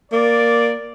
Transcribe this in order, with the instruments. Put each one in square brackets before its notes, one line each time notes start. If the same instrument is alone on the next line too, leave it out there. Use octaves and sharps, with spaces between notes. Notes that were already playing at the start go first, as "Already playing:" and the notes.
[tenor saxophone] A#3 [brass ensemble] D5